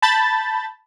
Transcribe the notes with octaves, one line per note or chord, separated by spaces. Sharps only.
A5 B5 G6 A6